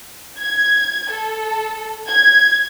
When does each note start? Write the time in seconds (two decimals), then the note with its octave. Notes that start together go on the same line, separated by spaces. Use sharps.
0.38 G#6
1.11 A4
2.08 G#6